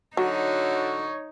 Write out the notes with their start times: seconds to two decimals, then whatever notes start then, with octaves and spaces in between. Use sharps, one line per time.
0.17 D3 F#3 D#4 F#4 C#5